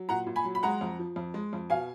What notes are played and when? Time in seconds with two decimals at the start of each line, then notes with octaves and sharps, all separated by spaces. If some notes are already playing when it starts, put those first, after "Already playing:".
Already playing: F#3
0.09 A#2 F#5 A#5
0.27 A#2
0.36 G#5 B5
0.44 F#3
0.55 B5
0.63 G#3 F#5 A#5
0.81 F2
0.99 F3
1.16 F2
1.34 G#3
1.53 F2
1.70 B2 F5 G#5